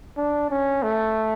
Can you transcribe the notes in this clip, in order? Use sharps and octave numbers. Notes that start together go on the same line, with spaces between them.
D4
C#4
A3